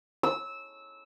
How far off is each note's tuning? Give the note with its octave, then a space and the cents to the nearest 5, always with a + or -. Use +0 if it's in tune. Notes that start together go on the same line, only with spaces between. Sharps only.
E6 -15